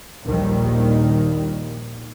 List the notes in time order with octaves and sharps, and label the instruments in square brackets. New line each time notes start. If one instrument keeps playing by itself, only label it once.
[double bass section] A#1 D#2 A#2 D#3 G3